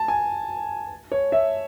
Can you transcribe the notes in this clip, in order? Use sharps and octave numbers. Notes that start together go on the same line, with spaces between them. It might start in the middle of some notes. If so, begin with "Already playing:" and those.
Already playing: A5
G#5
C#5
E5